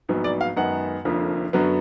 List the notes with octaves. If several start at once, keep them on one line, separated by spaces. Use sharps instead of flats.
A#1 G#2 F#3 B3
D5
F5
F#2 D#3 G#3 B3 F#5
F1 F2 D3 F3 A#3
F#2 D3 F#3 B3